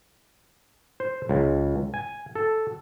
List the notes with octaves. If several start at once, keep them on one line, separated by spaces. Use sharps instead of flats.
C5
C#2
G#5
A4